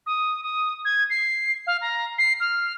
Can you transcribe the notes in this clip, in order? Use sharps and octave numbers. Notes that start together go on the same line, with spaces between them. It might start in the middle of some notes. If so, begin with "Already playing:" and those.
D#6
D#6
G#6
C7
F5
A#5
C7
F6